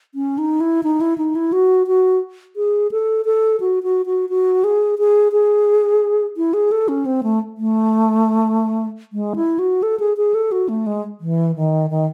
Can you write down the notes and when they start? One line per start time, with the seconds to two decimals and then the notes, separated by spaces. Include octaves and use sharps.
0.15 C#4
0.38 D#4
0.60 E4
0.83 D#4
1.01 E4
1.18 D#4
1.35 E4
1.52 F#4
1.87 F#4
2.56 G#4
2.92 A4
3.25 A4
3.60 F#4
3.83 F#4
4.06 F#4
4.29 F#4
4.64 G#4
4.99 G#4
5.32 G#4
6.37 E4
6.54 G#4
6.72 A4
6.88 C#4
7.06 C4
7.23 A3
7.58 A3
9.13 G#3
9.36 E4
9.59 F#4
9.83 A4
10.00 G#4
10.17 G#4
10.34 A4
10.52 F#4
10.69 A3
10.86 G#3
11.20 E3
11.56 D#3
11.90 D#3